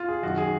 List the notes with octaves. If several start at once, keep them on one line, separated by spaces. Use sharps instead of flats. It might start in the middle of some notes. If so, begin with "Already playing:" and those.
Already playing: F4
G#4
F#2 D#3 F#4
G#4